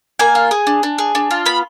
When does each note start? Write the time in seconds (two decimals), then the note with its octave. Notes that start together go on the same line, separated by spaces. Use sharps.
0.19 A#3 G#5
0.35 F4
0.51 G#4
0.67 D4
0.83 D4
0.98 G#4
1.15 D4
1.31 F4
1.46 B3 B5